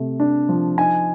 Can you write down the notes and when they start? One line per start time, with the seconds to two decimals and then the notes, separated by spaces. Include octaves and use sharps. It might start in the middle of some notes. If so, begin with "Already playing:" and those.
Already playing: C3 A3
0.20 D4
0.49 F3
0.77 D#4 G#5